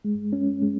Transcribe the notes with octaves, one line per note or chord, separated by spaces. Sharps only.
G#3
C#4
G#3